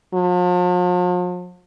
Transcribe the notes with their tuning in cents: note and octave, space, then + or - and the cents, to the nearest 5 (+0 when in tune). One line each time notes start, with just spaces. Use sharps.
F3 +45